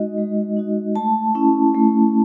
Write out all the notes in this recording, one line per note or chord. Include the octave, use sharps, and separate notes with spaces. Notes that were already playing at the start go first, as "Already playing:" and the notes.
Already playing: G#3 D#4 F#4 D#5
G#3
D#4 F#4
A3 A5
C#4 E4
A3